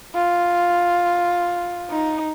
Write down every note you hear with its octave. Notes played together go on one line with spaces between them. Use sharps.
F4
D#4